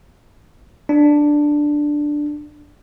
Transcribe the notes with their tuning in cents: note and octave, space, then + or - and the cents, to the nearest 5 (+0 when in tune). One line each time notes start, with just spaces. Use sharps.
D4 +5